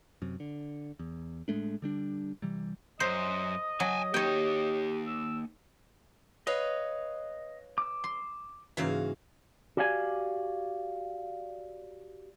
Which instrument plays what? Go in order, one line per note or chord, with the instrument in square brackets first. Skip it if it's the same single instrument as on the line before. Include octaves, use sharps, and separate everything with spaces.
[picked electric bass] F#2 C3
D3
E2
A2 G#3 A3 D4
D3 G3 D4
C3 E3 G3
[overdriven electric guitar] F#2 [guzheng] C5 [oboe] D#5
[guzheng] F#3 [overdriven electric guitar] G5 G#5
[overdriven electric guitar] A#3 D#4 [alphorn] G4 [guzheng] C#5 G5
[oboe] E6
[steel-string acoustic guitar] B4 C#5 F5 [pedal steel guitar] D#5
[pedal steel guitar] D6 E6
[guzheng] C6
[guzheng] G#2 C#3 E3 [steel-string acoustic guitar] A#3 F#4 F5
[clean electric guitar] F#4 G4 D5 F5 G#5